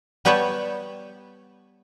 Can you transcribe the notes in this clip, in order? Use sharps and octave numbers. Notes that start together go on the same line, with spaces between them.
G3 B3 B4 C#5 G5 A5